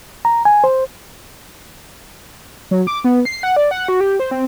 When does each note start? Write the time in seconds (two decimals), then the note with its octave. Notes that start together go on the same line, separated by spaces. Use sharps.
0.25 A#5
0.45 G#5
0.64 C5
2.71 F#3
2.87 D6
3.04 B3
3.25 C7
3.43 F#5
3.56 D5
3.71 F#5
3.88 F#4
4.00 G4
4.20 C5
4.31 C4